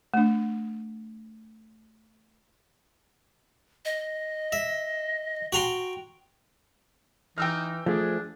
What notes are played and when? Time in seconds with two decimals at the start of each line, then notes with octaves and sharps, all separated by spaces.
0.14 A3 D4
3.85 D#5
4.52 E5
5.53 F#4 G5 A#5 C6
7.38 E3 D#4 G5 E6 F6
7.86 F3 A3 D4 G#4